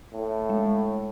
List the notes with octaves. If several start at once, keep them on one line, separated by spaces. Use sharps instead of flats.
A2
G#3